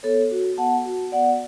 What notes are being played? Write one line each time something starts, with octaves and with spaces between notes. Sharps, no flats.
B3 A4 C#5
F#4
B3 F#5 A5
F#4
B3 D5 F#5